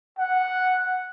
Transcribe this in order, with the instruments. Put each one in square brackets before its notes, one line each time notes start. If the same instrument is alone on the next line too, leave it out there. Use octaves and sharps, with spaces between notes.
[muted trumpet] F#5